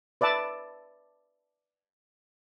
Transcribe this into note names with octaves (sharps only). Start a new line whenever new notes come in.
B4 D5 E5 A5